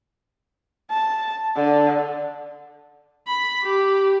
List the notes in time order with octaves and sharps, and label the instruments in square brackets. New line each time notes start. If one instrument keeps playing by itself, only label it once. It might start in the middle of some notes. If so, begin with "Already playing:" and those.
[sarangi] A5
D3
[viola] B5
G4